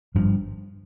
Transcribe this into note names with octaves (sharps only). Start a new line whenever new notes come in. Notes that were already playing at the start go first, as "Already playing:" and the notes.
G#1 G2 F3